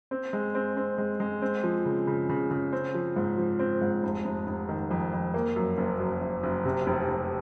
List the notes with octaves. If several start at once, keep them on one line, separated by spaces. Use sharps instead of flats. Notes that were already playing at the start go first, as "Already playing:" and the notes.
C4
G#3
C4
C4
G#3
G#3
C4
F3
C#3
C#3
C#3
C#3
C4
F3
G#2
F3
C4
G#2
F1
F1
F1
D#3
F2
F2
A#3
F#2
F#1
F#2
F#1
F#1
C3
F1
F1